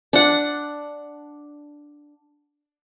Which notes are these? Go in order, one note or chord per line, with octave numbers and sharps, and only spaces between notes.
D4 F#5